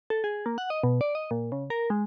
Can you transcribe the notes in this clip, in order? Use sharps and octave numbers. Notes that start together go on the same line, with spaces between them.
A4
G#4
A#3
F#5
D#5
B2
D5
D#5
A#2
C#3
A#4
G#3